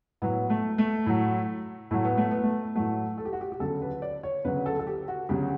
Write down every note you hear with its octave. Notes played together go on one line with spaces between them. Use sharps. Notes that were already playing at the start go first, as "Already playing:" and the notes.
A2 F#3 B3
A3
A3
A2 F#3
A2 F#3 A3
B3
A3
B3
A3
A2 F#3 A3
A4
G4
F#4
G4
G4
D2 C#3 F#3 A4
B4
D5
C#5
D2 C#3 F#3 B4
A4
A4
G4
F#4
D2 C#3 F#3 G4